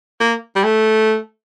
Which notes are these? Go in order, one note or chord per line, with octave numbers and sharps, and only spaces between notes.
A#3
G3
A3